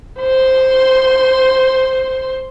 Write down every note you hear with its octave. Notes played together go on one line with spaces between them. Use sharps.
C5 C6